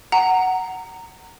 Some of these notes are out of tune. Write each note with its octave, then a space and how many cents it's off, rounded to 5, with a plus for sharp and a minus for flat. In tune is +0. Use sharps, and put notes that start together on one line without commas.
F#5 +10 A#5 -15